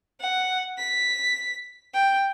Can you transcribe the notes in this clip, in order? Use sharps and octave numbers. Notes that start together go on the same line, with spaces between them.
F#5
B6
G5